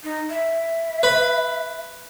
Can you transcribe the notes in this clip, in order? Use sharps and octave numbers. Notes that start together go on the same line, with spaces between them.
D#4
E5
B4 B5